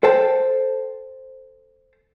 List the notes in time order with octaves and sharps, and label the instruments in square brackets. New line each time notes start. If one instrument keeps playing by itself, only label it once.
[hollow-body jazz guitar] A4 C5 G5 A5